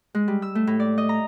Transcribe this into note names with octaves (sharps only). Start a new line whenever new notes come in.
G#3
G3
E6
A3
A2
D5
D#5
A#5